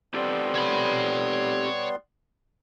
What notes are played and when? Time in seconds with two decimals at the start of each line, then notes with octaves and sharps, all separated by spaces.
0.14 G3 B3 C4 G4 A4 C6
0.55 C#5 B5